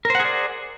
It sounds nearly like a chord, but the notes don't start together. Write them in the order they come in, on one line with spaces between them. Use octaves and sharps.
A#4 C5 F#5 G#4 D5